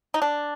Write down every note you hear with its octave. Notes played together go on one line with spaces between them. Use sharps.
D#4
D4